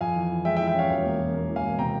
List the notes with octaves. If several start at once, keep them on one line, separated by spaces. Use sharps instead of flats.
F2 F5 G#5
E3
E3
G#3 E5 G5
E5 G5
E3
E5 G5
C#4 C#5 F5
E1
A#3
E1
A#3
E3
F5 G#5
E1
C3 G5 A#5